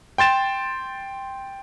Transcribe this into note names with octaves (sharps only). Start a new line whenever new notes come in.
G5 C6 A6 E7